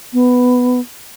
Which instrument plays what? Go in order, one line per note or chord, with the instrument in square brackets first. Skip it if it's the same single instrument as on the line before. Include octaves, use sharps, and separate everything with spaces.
[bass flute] B3